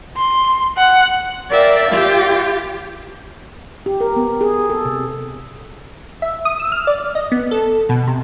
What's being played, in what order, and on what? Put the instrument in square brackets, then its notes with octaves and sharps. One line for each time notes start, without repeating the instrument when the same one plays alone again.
[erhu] C6
F#5
[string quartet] A#4 D5 E5 F5 G5
F4 G4
[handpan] G4
A#4
B3
G#4
A4
C3
[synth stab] E5
D#6
E6
F6
D5
D#5
B3
A4
B2
C3